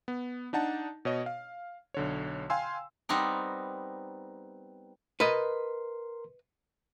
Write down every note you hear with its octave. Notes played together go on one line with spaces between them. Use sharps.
B3
D4 D#4 F#5 A5
B2 C#5 D#5
F5
B1 D3 C#5
F5 G5 G#5 C6 E6
G3 B3 C4 D#4 A#4
A#4 B4 D#5 C6